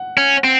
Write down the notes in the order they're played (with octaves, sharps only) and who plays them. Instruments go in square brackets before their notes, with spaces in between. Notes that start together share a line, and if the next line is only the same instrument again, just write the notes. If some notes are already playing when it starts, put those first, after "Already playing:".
Already playing: [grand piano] F#5
[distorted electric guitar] C#4
C4